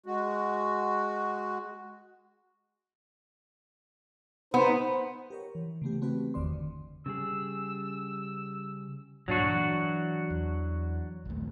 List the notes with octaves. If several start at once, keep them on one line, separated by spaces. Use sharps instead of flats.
G#3 F#4
B3 D#4 C5
G4 A#4 C#5
E3
C#3 E3 A3 B3 G4
A3 C4 F#4 G4 B4
G1 E2 D#3 D5 C6
D3
C#3 G3 G#4 E6
G2 A#2 C#3 F#3 D4 F#4
E3
E2
A#1 D#2 A3